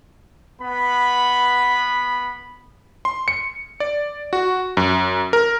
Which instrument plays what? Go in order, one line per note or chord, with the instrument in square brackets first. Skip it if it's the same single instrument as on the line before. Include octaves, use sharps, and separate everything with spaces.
[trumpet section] B3 B5
[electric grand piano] C6
C#7
D5
F#4
F#2
A#4